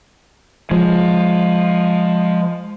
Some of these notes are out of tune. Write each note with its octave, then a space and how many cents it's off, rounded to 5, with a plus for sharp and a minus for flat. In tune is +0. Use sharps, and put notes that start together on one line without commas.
F3 +15 G#3 +0